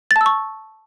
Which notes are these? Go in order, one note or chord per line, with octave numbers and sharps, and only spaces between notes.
A6
A5
E6
C#6